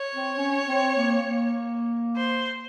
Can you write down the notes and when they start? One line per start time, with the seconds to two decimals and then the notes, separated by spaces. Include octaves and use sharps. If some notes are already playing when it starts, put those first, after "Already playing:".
Already playing: C#5
0.15 C4
0.37 C#4
0.68 C4
0.97 A#3
1.27 A#3
2.16 C5